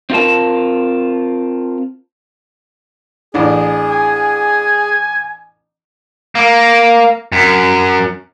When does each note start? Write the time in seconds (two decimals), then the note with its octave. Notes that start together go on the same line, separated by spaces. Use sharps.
0.10 C4 D#4 F4 A#4 A5
3.34 A1 D4 G#4
3.90 G#5
6.35 A#3
7.32 F#2